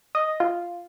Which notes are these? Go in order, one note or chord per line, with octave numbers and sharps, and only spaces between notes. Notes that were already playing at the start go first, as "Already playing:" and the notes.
D#5
F4